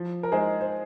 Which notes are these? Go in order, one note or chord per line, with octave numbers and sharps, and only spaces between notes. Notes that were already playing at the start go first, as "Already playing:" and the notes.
Already playing: F3
A#4
G#3 D#4 G#4 C5
C5